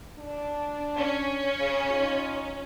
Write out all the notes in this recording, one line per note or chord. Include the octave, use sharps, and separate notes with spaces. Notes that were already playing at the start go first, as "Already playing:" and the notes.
D4
C#4
C#3
D#4 F4